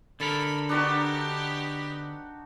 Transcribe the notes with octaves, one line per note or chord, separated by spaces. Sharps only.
D3 A4 A#4 B5
B3 D4 D#4 F#4 G4